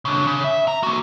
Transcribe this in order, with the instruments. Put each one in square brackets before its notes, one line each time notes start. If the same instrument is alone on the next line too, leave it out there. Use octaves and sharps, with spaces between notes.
[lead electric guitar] C#3 D4
C#3
E5
A#5
A#3 F#4